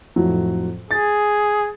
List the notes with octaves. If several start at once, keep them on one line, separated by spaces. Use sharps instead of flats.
F2 A2 F#3
G#4 A6